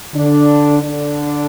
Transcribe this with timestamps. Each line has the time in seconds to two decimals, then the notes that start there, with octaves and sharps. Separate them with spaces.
0.14 D3 D4
0.83 D3 D4